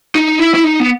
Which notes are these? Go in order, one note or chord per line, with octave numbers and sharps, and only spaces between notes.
D#4
E4
E4
D#4
B3